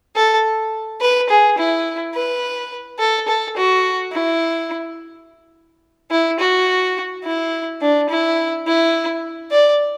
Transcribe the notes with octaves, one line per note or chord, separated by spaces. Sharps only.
A4
B4
G#4
E4
B4
A4
A4
F#4
E4
E4
F#4
E4
D4
E4
E4
D5